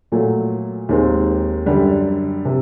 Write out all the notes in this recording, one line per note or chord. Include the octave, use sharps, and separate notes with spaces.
A#2 F#3 A3
D#2 D#3 G#3 C4
F#2 D3 G3
C3